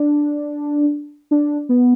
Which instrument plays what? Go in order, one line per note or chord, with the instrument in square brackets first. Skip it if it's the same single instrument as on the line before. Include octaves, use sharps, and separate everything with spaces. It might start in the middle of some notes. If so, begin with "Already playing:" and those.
Already playing: [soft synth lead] D4
D4
B3